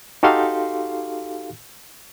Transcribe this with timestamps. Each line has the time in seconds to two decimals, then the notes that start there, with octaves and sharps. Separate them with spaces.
0.23 D#4 F#4 G4 A4 F5 C6